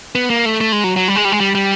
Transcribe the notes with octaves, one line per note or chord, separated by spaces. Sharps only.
B3
A#3
A3
A3
G#3
F#3
F#3
G3
G#3
G3
G#3
G3
G3